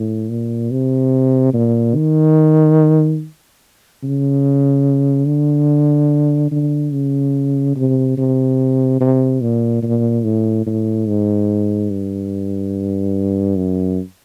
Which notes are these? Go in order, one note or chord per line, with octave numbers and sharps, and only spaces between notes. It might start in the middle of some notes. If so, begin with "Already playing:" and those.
Already playing: A2
A#2
C3
A#2
D#3
C#3
D3
D3
C#3
C3
C3
C3
A#2
A#2
A2
A2
G#2
G2
F#2